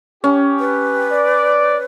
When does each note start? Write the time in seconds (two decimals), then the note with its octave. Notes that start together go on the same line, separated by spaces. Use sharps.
0.24 C#4 G4
0.59 B4
1.11 D5